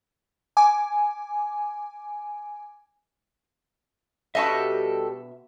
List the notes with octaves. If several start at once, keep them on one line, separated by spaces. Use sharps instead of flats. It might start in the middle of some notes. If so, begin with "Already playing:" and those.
G#5 D6
B2 G3 F#4 G4 A4 D#5 E5